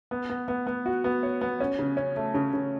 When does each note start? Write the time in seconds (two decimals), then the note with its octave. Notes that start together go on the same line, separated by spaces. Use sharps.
0.11 B3
0.30 B3
0.48 B3
0.67 B3
0.86 F#4
1.04 B3
1.23 C#5
1.41 B3
1.60 C#4
1.79 C#3
1.97 C#4
2.16 A3
2.34 C#3
2.53 C#3